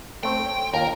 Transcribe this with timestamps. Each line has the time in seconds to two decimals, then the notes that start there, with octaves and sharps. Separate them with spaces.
0.23 A3 C4 G5
0.46 C#5
0.74 D#2 F4 A#4 C#5